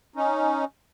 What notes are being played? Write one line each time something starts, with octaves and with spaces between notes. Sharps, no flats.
C#4 D#4